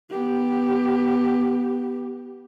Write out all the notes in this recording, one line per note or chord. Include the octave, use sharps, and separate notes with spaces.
B3 G4